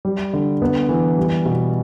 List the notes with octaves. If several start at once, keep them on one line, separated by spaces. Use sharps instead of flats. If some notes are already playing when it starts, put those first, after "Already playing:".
G3
D3
B3
E3
G3
B2